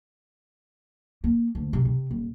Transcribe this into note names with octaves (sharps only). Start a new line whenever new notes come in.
A#3
D2
C3
C3
D#1